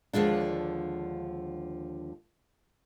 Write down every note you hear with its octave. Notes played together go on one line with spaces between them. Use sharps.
D#2 D3 F3 G#3 D4